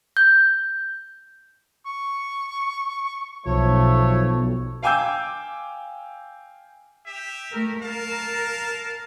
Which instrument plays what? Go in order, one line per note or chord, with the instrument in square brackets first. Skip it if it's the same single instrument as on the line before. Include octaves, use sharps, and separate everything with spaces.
[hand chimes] G6
[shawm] C#6
[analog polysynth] B1 [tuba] F3 [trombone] A3 [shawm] C#5
[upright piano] F5 G5 G#5 D6 E6 G6
[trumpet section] G4 E5
[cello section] A3 A#4
[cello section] A#4 [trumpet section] F5 A5